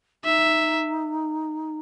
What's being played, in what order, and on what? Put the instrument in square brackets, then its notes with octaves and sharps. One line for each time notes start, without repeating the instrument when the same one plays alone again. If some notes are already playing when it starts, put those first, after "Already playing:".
[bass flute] D#4 [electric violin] E5